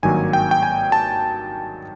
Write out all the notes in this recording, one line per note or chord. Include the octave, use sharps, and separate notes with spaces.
G#1 G2 D#3 F#3 A#3 G#5
G5
G5
G#5
A5